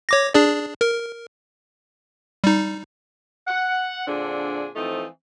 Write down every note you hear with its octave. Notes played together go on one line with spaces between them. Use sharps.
C#5 D6 A#6
D4 G#4 D5
A#4
G3 D#4
F#5
A#2 D3 C4 D4 G#4
E3 F3 A3 C4 D#4